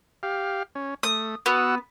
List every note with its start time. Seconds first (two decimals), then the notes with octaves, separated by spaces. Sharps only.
0.23 G4 F5
0.75 C#4
1.03 A3 D#6
1.46 B3 F#4 F#5 E6